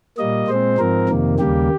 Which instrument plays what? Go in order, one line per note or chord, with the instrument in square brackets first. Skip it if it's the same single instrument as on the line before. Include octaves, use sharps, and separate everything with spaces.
[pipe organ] A#2 G3 A#3 D#5
A#2 G#3 C4 C5
G#2 F3 C4 A#4
F2 C3 D#3 A#3
D#2 C#3 G3 A#3 G4